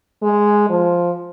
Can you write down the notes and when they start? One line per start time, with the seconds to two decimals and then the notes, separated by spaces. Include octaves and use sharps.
0.23 G#3
0.70 F3